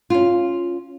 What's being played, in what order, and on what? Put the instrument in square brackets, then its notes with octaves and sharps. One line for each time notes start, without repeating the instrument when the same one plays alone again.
[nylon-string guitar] C#4 F4